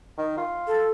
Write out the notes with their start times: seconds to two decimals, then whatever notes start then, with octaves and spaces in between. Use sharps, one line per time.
0.18 D#3
0.37 F4
0.67 A4